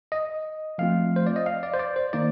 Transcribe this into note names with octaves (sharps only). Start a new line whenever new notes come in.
D#5
F3 A3 C4 F4 F5
C5
D5
D#5
F5
D5
C5
D5
C5
D#3 A#3 D#4 D5